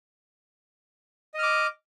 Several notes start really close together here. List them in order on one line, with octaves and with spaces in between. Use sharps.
D#5 F6 D6